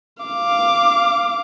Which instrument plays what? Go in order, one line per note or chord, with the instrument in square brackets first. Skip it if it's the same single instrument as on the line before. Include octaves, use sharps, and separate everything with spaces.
[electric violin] F5 D6